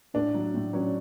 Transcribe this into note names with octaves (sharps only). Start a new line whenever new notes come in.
A2 D4
F#3
A2
F#3 C#4